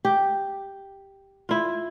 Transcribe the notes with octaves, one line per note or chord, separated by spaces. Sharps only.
G4
E4 F4